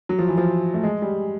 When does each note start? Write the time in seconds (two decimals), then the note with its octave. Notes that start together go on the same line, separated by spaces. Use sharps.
0.09 F#3
0.19 F3
0.28 E3
0.37 F3
0.74 A3
0.83 G#3
1.02 G3